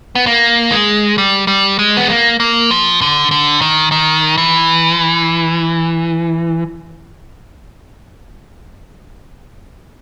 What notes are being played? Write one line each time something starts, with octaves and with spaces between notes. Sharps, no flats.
B3
A#3
G#3
G3
G3
G#3
B3
A#3
A#3
F3
D3
D3
D#3
D#3
E3